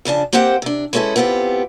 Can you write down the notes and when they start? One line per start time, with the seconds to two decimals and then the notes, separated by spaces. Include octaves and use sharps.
0.05 F2 C#3 D4 A5
0.33 A#3 C4 G4 C5 F#5 G5
0.62 C3 D4
0.93 G#3 B3 C#4 E4 A4 B4
1.16 A2 B3 C4 F4 G4